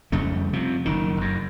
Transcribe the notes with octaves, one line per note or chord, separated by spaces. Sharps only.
F2 C#3 G3 A3
C3 F3
F#1 D#3
F#1 F#2